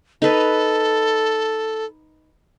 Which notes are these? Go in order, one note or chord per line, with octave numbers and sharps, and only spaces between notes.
D#4 A4 B4